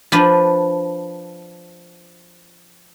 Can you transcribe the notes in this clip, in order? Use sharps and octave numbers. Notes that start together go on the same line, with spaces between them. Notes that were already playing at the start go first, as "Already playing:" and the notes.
F3 D4 B4